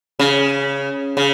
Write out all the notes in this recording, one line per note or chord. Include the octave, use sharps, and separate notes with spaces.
C#3
C#3